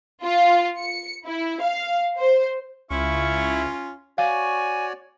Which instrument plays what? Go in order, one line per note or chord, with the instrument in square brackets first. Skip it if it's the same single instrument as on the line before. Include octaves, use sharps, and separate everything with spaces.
[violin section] F4
C#7
E4
F5
C5
[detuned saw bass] C#2 [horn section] C#4 F4 [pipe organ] E4 [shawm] C#6
[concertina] F#4 C#5 D5 [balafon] F5 [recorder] G#5